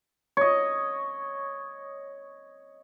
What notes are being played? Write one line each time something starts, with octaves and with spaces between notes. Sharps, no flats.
C#5 D#5